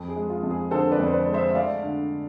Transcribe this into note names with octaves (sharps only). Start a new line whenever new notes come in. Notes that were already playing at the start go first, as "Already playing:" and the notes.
Already playing: F2
G#4
G#3
F4
F2
G#4
D3 A4 C5
B4 D5
F2
C5
B4 D5
G#3
C5 E5
E5
A3 D5 F5
D3